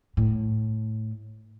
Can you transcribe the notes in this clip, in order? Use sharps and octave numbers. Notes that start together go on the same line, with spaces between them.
A2